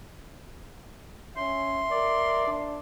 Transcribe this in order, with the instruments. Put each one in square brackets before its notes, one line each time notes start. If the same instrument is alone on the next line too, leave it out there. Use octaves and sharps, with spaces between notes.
[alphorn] C#4 [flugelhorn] E5 [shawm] C6
[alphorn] A#4 [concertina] D5
[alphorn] D4